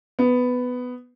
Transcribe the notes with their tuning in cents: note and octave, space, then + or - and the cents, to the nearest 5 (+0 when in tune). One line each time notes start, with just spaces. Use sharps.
B3 +10